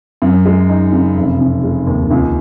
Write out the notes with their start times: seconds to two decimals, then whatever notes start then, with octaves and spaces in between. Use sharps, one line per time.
0.22 F#2
0.46 G#3
0.69 D#4
0.92 C#3
1.17 F1
1.39 C#3
1.64 G#3
1.87 D#2
2.11 C#2